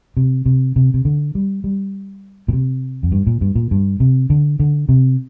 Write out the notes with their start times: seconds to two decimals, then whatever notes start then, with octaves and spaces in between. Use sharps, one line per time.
0.17 C3
0.46 C3
0.76 C3
0.94 C3
1.05 D3
1.35 G3
1.64 G3
2.48 A#2
2.53 C3
3.03 F2
3.12 G2
3.27 A#2
3.41 G2
3.55 A#2
3.71 G2
4.00 C3
4.30 D3
4.60 D3
4.89 C3